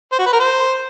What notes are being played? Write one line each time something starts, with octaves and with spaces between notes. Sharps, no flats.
C5
F#4
B4
A#4
C5